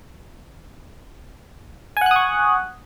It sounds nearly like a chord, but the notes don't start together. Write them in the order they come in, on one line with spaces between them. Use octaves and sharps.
G#5 F#5 F#6 D#6 C#6